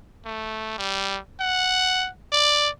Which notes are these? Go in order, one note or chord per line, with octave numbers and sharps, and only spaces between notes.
A3
G3
F#5
D5